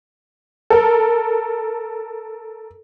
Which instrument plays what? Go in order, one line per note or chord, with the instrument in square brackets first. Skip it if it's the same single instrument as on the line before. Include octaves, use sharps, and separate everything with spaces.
[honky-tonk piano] A4 A#4